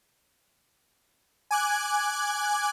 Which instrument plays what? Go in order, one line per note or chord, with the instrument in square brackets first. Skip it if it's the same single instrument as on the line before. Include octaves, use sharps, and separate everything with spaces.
[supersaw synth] G#5 D6 F#6 G#6